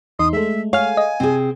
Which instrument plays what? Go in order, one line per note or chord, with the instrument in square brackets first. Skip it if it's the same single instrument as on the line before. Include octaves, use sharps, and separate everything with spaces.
[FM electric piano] E2 D#4 C6 [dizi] D#6
[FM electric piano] G#3 A3 [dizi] E5
[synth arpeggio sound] C#5 F6 [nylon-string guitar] F5 [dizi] G#5
[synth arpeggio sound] D#5
[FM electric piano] C3 [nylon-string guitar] C4 G#4